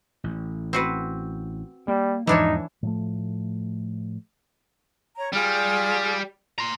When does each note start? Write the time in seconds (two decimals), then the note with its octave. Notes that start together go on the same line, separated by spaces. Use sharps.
0.24 A1
0.73 C4 F#4 B4
1.88 G3 A#3
2.27 E2 G#2 E3 F3 D4 D#4 C#5
2.83 A2 F3 A3
5.16 C#5 A#5
5.32 G3 F4 G#4 F6
6.58 A#5 C6